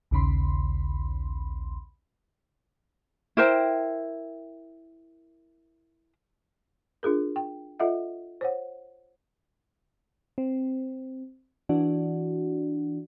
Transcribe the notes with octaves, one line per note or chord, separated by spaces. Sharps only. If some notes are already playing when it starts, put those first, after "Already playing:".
A#1 D#2 C#3 B5 C6
E4 A#4 C5 G5
D4 F4 G#4 A#4
G5
F4 A4 D#5 E5 F#5
C5 C#5 F#5
C4
E3 D4 F#4